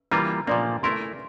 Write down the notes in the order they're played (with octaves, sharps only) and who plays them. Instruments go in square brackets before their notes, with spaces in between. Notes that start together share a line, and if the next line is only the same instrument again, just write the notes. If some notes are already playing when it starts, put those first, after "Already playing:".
[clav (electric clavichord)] E3 G3 A#3 F4 [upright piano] A#5
[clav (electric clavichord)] A#2 F3 A#3 [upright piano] D5
[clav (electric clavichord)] A3 E4 A#4 [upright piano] C6